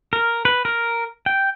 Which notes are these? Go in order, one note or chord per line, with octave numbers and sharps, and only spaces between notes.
A#4
B4
A#4
G5